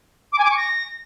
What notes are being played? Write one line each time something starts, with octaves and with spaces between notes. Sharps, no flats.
D6
G#5
D6
C#6
A#6